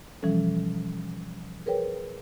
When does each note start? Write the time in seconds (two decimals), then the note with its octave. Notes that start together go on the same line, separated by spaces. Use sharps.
0.22 B2 E3 F3 G3 C#4 A4
1.66 G#4 A#4 B4 C#5 G5